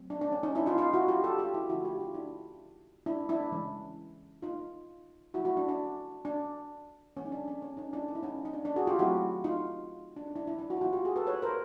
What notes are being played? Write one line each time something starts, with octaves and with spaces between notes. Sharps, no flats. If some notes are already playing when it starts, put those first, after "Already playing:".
Already playing: F#3 A3 C4
D4
D4
C#4
C#4 D#4
D4 E4
D#4 F4
D#4 F4
E4 F#4
F4 G4
G4 A4
F4 G4
E4 F#4
D3 F3 A3 C#4 E4 F#4
F4 G4
D#4 F4
D4 E4
D4 E4
D4 E4
C#3 E3 G#3 C#4
D#4 F4
F3 A3 C#4 E4 F#4
E4 F#4
D4
D4
D4
E3 G#3 B3 C#4
D#4
D4
D4
C#4
C#4 D#4
D4 E4
D#4
E4
C#4 D#4
D#4
D4
D4
F#4 G#4
F4 G4
D#3 F#3 A3 C4 E4 F#4
D#4 F4
D4
D#4
D4 E4
D4 E4
D4 E4
E4 F#4
F4
E3 G3 B3 E4 F#4
F4 G4
F#4 G#4
A4 B4
B4 C#5
A#4 C5